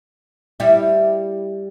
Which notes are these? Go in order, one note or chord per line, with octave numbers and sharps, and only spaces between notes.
G3 E4